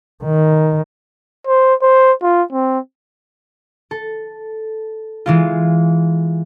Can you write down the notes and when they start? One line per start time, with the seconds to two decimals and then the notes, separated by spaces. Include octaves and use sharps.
0.24 D#3
1.47 C5
1.82 C5
2.22 F4
2.52 C4
3.91 A4
5.26 E3 G#3 F4